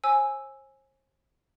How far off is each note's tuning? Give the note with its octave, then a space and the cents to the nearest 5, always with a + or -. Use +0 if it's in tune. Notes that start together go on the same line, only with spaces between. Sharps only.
C5 +45 G#5 +0 E6 +0